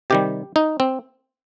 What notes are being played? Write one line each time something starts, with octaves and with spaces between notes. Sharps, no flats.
C3 D#3 G3 G4
D#4
C4